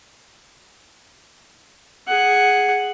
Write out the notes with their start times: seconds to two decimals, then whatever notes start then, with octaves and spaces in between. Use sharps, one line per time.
2.08 G#4 F#5